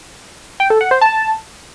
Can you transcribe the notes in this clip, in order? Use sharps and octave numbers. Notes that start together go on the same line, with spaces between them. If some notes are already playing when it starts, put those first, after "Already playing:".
G5
A4
F#5
C5
A5